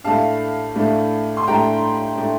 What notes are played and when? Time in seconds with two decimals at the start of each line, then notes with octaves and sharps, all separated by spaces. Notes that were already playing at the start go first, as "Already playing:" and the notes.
0.04 A2 A3 D4 F5 A5
0.75 A2 A3 D4
1.37 C6
1.47 A2 A3 D4 G5 A#5
2.18 A2 A3 D4